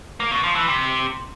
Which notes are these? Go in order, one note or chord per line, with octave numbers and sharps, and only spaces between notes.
A#3
B2
F3
E3
C3